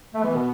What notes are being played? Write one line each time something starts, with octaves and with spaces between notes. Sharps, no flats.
A3 B3
E3
B2